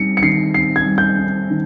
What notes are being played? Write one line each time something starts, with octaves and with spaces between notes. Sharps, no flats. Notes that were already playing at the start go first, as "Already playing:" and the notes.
Already playing: G3 C4 D#4 C#7
C#7
D#3 C7
C4 C7
G#6
G3
G6
D#4
D#3